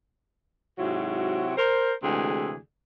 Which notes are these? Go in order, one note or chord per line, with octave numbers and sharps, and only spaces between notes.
G#2 C3 F#3 E4 F#4
A#4 C5
D2 C3 E3 G#3 G#4